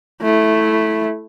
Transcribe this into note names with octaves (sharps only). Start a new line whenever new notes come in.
A3 E4